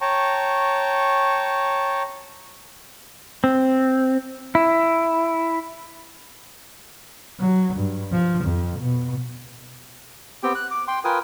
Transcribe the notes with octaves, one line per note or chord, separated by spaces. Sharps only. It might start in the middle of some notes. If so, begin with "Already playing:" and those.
C#5 G5 A5 A#5 C#6
C4
E4
F#3
G2
F3
F2
B2
B3 C4 G4 G5
F#6
D6
G5 C6
F4 A#4 B4 G5 G#5 D#6